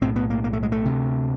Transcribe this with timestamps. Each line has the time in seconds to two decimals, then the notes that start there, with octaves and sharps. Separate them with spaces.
0.01 B1 A2 C4
0.16 B3
0.30 A#3
0.44 A#3
0.53 A3
0.63 G#3
0.72 A3
0.85 D2 C3